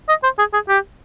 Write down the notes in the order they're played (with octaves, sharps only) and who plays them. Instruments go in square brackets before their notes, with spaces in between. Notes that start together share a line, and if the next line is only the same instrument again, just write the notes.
[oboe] D#5
C5
G#4
G#4
G4